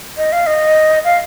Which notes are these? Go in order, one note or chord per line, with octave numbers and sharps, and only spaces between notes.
D#5
F5
D#5
F5